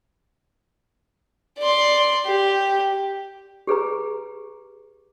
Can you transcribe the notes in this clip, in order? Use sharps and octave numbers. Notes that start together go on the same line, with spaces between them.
D5 C6
G4
G4 G#4 B4 A#5